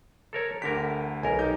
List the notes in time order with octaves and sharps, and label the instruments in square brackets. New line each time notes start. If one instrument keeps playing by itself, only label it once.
[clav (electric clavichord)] A4 A#4 C#5
[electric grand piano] D2 D3 B6 [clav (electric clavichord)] G4 A#4
[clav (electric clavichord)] B1 A#4 [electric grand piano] G#5
[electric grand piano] D#4 G4 G6